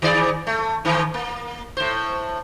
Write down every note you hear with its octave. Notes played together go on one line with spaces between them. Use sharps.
D#3 G#4 D5
A3
A2 D#3 E3
A#3
A2 C5